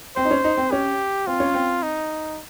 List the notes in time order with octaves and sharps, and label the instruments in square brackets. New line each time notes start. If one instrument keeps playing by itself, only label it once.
[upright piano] C4 [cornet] C5
[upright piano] D#4
C#4
D#4
C4
[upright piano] C#4 [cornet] G4
[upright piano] C4 [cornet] F4
[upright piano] C#4
C4
[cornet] D#4